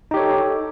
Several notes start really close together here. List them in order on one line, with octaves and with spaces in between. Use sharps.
D#4 G4 C#5 A4